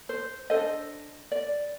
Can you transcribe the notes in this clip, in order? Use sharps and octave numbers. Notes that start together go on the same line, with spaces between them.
C5
D4 A4 C5 D#5
D5